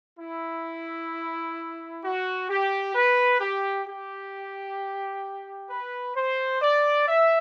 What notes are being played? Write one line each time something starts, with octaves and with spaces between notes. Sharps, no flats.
E4
F#4
G4
B4
G4
G4
B4
C5
D5
E5